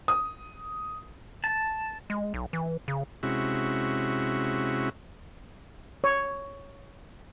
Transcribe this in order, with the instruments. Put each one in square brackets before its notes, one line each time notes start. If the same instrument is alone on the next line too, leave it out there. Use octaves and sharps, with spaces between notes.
[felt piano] D#6
[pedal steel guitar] A5
[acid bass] G#3
B1
E3
C#3
[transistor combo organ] C3 G#3 C#4 E4 F#4
[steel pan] C#5